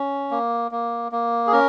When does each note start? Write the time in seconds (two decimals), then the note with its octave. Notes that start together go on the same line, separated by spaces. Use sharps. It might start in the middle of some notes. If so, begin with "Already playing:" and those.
Already playing: C#4
0.31 A#3
0.71 A#3
1.12 A#3
1.47 G#4
1.52 C#4 A#4